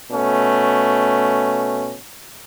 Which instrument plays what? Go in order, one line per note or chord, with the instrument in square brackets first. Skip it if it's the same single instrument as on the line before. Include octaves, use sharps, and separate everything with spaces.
[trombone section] B2 A3 C#4